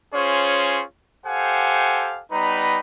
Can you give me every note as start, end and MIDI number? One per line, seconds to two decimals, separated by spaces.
0.14 0.83 61
0.14 0.83 65
0.14 0.83 68
0.14 0.83 72
0.14 0.83 73
1.25 2.21 67
1.25 2.21 69
1.25 2.21 72
1.25 2.21 77
1.25 2.21 78
1.25 2.21 80
2.32 2.80 55
2.32 2.80 59
2.32 2.80 63
2.32 2.80 71
2.32 2.80 82
2.32 2.80 83